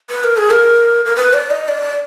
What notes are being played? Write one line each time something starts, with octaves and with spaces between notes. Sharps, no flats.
B4
A#4
G#4
A#4
A#4
B4
D5
D#5
D5